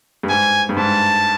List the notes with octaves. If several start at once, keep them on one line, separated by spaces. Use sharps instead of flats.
G2
G#2 G#5
G2
G#2 A5